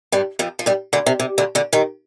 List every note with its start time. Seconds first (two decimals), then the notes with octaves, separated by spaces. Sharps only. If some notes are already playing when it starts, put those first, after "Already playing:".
0.12 G2 G3
0.39 F2 F3
0.59 F3
0.66 G2 G3
0.93 D2 D3
1.06 C3
1.19 C3
1.38 D2 D3
1.55 D2 D3
1.73 D#2 D#3